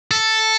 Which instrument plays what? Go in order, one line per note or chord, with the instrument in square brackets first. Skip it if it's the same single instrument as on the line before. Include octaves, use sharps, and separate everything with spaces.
[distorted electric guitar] A4